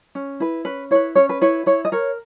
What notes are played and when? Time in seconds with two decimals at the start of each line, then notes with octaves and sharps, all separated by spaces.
0.15 C#4
0.40 E4 B4
0.65 C#4 B4
0.91 E4 B4 C#5
1.15 C#4 C#5
1.29 B4
1.41 E4 B4 C#5
1.66 E4 C#5
1.85 D#5
1.92 A#4 C#5